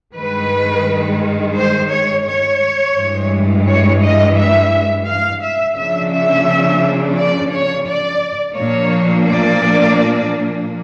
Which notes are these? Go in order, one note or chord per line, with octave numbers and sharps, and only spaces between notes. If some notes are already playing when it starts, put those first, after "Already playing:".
G2 D#3 G#3 B4
C5
C#5
C#5
G2 E3 G#3
C#5
D#5
E5
F5
E5
C#3 F3 A#3 D4 E5
E5
D5
C#5
D5
A#2 F3 A#3 D4 C#5
D5